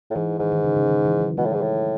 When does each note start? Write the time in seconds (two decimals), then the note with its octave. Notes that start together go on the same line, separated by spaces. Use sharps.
0.10 A2
0.15 G#2 E3
0.39 G#2 D#3
0.52 D#3
0.64 C#3
0.76 C#3
0.88 D#3
1.05 E3
1.21 F#3
1.37 B2 G#3
1.45 A2
1.53 G#2
1.61 A2